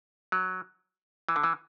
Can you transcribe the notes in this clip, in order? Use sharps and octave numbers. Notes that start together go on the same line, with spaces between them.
F#3
E3
D3
E3